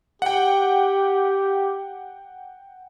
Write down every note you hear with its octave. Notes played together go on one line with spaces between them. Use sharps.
G4 F#5 G5